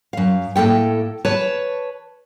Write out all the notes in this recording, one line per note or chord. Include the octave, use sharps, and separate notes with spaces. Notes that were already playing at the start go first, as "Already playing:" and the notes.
F#2 F5
A2 A#3 A4 G5
B4 C#5 A5